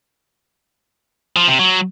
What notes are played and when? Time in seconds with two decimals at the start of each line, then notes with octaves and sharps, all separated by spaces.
1.36 F3
1.48 C3
1.59 F#3